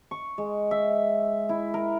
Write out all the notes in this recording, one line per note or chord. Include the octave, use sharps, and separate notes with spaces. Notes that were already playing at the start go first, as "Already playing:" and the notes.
C#6
G#3
E5
E4
A#4